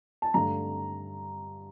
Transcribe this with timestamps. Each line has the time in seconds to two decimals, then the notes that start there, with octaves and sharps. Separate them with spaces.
0.22 A5
0.34 G2 D3 A3 A#5